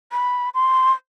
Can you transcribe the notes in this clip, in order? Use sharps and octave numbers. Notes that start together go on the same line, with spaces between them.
B5
C6